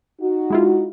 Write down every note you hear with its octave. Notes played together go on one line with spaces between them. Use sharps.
D#4 F#4
G#3 E4 F4